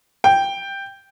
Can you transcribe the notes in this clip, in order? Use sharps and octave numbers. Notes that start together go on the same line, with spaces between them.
G5